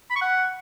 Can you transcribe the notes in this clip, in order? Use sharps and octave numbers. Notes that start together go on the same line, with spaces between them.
B5
C#6
F#5